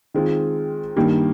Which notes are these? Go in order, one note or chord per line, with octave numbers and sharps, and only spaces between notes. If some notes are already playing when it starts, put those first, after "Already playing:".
D#3 G#3 C4 F4
G2 D#3 G3 A#3